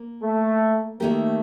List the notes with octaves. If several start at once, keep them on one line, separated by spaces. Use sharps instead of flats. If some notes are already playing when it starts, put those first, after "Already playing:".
Already playing: A#3
A3
D#3 A3 A#3 D#4 G4 A#4